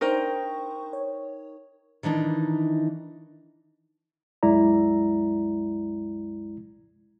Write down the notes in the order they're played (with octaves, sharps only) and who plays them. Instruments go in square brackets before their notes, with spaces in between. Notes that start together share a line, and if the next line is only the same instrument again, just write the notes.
[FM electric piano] D4 C5 C#6 [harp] D#4 A#4 G5
[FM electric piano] C#5
[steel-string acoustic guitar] D#3 E3 D4 D#4
[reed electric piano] C2 F#2 G#3 E4 D5 A#5